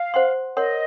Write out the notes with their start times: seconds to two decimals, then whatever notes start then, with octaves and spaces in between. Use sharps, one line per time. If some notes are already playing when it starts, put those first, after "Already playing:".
Already playing: F5
0.14 C5 F#5 C6
0.57 A#4 C#5 D#5 F#5 C6